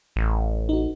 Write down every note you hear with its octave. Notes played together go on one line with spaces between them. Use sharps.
A1
D#4 F#4